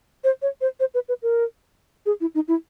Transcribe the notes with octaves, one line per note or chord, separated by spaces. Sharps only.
C5
C#5
C5
C5
B4
B4
A#4
G#4
E4
D#4
E4